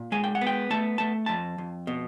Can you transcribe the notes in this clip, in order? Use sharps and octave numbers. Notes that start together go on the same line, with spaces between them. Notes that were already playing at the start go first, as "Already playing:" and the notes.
Already playing: A#2
G#3 G#5
G5
F#5
B3
G5
A3 A5
A3 A5
F2 A5
F2
B2